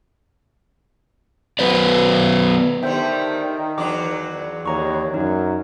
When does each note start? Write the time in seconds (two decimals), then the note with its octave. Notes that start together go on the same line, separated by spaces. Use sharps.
1.59 F#3 B3 B4 C5 D5
2.83 D3 D#3 G3 A3 C5 E5 G5
3.78 E2 F#3 D4 D6
4.66 D#2 C#5 A#5 C#6
5.14 F#2 D#4